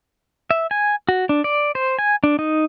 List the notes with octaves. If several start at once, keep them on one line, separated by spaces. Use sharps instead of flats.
E5
G#5
F#4
D4
D5
C5
G#5
D4
D#4